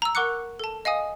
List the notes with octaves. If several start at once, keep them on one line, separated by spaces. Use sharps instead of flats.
A#5 E6
A#4 F#5 C#6 D6 F#6 C#7
A4 A5
D#5 F5 G#5 D#6